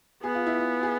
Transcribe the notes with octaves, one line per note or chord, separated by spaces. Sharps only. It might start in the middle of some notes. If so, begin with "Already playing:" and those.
B3 G#4
F4
E4
F4
G#4